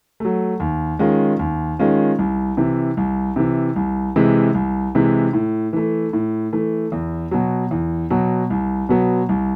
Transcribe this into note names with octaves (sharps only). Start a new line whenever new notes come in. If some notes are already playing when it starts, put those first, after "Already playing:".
F#3 A3
D#2
D#3 G#3 C#4 F4
D#2
D#3 G#3 C#4 F4
C2
C3 E3
C2
C3 E3
C2
C3 E3 G#3
C2
C3 E3 G#3
A2
E3 A3
A2
E3 A3
E2
B2 F#3
E2
B2 F#3
C2
B2 F#3 B3
C2